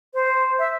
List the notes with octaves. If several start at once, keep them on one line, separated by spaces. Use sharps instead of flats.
C5
E5